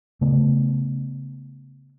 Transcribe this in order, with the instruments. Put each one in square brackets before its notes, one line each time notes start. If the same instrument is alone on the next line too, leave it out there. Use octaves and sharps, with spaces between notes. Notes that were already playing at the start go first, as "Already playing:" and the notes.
[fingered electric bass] C#3 A3 B3